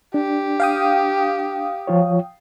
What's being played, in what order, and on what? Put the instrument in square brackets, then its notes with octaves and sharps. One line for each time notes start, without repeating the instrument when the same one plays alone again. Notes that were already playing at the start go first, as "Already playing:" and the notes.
[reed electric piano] D4 [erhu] G4
[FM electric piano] F5 G5 D#6
[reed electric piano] F3 F4 C#5